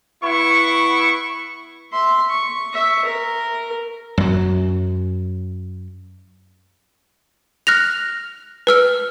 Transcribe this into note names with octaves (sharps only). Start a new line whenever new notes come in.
B3 E4 C#6
E5 C6
C#6
E5 C#6
A#4
F#2 F#3
F6 F#6 A#6 F7
B4 E6 F6